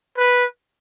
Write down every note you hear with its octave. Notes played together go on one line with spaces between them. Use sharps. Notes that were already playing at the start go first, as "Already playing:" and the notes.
B4